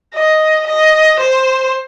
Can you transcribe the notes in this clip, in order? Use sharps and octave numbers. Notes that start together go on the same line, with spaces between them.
D#5
D#5
C5